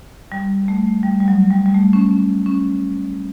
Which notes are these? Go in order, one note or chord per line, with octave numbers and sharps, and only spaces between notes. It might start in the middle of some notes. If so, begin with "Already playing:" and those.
G3
A3
G3
G3
F#3
G3
G3
A3
C#4
C#4
C#4